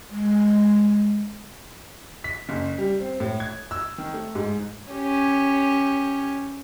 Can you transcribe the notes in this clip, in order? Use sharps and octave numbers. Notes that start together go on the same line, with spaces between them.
G#3
B6
F#1
G3
C4
A2
G#6
E6
D#3
A3
G#2
C#4 G4